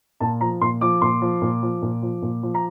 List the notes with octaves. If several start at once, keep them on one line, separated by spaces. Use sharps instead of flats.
A#2 A5
F3 A#5
A#2 C6
F3 D6
A#2 C6
F3
A#2
F3
A#2
F3
A#2
F3
A#5